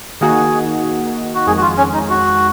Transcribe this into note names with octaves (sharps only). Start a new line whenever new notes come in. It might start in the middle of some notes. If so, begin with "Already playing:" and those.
D#3 A#3 D#4 F#4 G#4
F#4
F2 D#3 G#3 G#4
F#4
F4
C#4
D#4
F#4